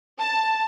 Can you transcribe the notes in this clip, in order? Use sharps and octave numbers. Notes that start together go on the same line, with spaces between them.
A5